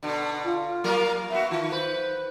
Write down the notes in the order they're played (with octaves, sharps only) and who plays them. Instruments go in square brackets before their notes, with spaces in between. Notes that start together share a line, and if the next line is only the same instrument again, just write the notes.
[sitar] B2 D3
[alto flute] F4
[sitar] F#3 A#3 A#4
[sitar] B3 F#4 [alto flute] E5
[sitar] D#3 [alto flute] F4
[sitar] B4 [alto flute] C5